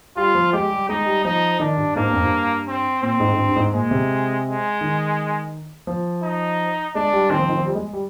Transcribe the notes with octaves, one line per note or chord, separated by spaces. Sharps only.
G3 F4
F3
G#3 G4
G3
G#3 D#4
G3
F3 D#4
D#3 D4
G2
G#2 A#3
G2
F2
G2
C4
A#2 C4
G#2
G#2
G2
G2
G#2
A#2 G#3
C3
G#3
D#3
F3
D#4
G#3 D4
G3
D#3 C4
F3
D#3
F3
G3
G#3
G3